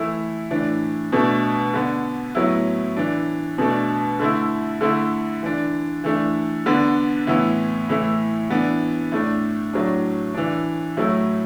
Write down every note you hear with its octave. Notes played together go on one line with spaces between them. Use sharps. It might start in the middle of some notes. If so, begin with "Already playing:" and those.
Already playing: E3 A3 E4
A2 E3 D4
B2 A3 D4
D3 B3 D4
A2 F#3 B3 E4
E3 D4
B2 A3 D4
D3 A3 E4
D3 A3 E4
E3 D4
E3 A3 D4
D3 B3 D4
A2 E3 B3 E4
A2 E3 A3 E4
E3 B3 D4
A2 A3 D4
A2 F#3 D4
E3 D4
A2 F#3 A3 E4